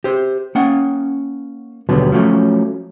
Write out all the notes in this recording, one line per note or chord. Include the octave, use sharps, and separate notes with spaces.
G4 C5
A#3 C#4 F#5
D#2 B2 D3 F#3 G3 B3
F3 F#3 A3 C#4